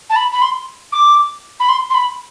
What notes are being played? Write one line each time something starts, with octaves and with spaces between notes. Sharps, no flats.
A5
B5
B5
C6
D6
B5
C6
C6
B5